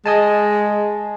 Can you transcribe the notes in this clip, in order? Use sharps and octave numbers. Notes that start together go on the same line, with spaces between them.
G#3 D#5 G#5 A5